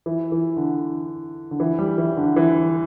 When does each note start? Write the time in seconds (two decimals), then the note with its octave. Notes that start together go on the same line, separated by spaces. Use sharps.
0.06 E3
0.32 E3
0.57 D3
1.51 D3
1.60 E3
1.79 G3
1.98 E3
2.17 D3
2.36 E3